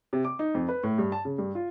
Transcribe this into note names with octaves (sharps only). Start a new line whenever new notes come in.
C3
D6
D#4
F2
B4
A2
G2
A5
C#3
G2
F4